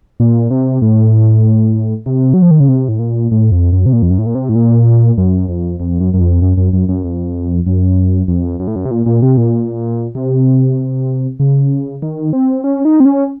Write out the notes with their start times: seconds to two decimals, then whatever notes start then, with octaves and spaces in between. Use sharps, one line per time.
0.20 A#2
0.50 C3
0.82 A2
2.06 C3
2.34 F#3
2.42 F3
2.51 D#3
2.60 C#3
2.68 C3
2.88 A2
2.99 A#2
3.31 A2
3.52 F2
3.72 F#2
3.86 C3
3.93 A#2
4.02 F2
4.10 F#2
4.18 A2
4.26 A#2
4.35 C3
4.49 A2
4.55 A#2
5.18 F#2
5.48 F2
5.80 F2
6.00 F#2
6.14 F#2
6.21 F2
6.42 F#2
6.57 F#2
6.73 F#2
6.89 F#2
7.04 F2
7.66 F#2
8.28 F2
8.60 F#2
8.67 A2
8.76 F#2
8.85 C3
8.91 A#2
9.06 A#2
9.22 C3
9.37 A#2
10.15 C3
11.40 C#3
12.02 D#3
12.33 C4
12.64 C#4
12.85 D#4
13.00 C4
13.05 C#4